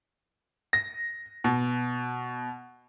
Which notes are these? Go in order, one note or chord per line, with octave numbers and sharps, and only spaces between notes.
A#6
B2